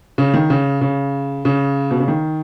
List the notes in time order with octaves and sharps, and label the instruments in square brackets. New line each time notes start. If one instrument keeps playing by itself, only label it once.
[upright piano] C#3
D#3
C#3
C#3
C#3
B2
C#3
D#3